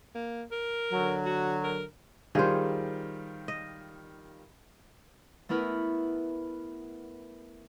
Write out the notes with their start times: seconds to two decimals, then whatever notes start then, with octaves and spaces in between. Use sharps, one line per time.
0.15 A#3
0.51 A#4
0.92 D3 F#3
1.26 F#4
1.64 A#4
2.35 D#3 G3 F4 G#4 C5
3.48 D#5
5.49 A3 B3 E4 A#4 B4